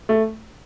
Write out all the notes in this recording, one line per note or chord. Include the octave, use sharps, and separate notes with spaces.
A3